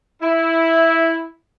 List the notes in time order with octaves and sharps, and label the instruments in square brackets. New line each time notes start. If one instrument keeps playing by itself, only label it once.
[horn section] E4